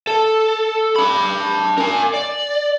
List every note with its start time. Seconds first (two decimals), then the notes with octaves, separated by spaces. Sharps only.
0.07 A4
0.96 D4 B5
1.77 A#4 G#5
2.14 D5